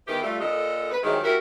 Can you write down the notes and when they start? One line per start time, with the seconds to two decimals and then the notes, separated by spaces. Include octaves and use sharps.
0.07 D#3 E3 B3 G4
0.22 G3 A3 F4
0.40 A#2 D3 A4 D#5
0.91 B4
1.03 G#2 D#3 F#3 G#3 E4 G4
1.24 E4 F#4 G4 A#4